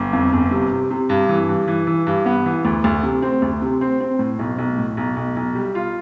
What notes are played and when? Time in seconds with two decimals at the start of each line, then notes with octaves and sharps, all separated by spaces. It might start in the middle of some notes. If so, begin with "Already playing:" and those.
Already playing: G1
0.13 F2
0.32 G1
0.51 C3
0.71 C3
0.90 C3
1.09 G2
1.29 E3
1.49 G2
1.68 E3
1.87 E3
2.07 G2
2.26 B3
2.46 E3
2.65 D2
2.84 D2
3.03 C3
3.22 C4
3.42 D2
3.62 C3
3.81 C4
4.01 C4
4.19 A2
4.39 B1
4.58 B1
4.78 A2
4.97 B1
5.16 B1
5.36 B1
5.55 G3
5.75 F4